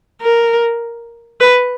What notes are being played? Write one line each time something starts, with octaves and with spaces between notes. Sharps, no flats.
A#4
B4